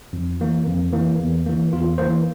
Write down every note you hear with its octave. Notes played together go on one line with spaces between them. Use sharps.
F2
E3 A#3
F2
E3 A#3
E2
E3 A#3
E2 F4
E3 A#3 C5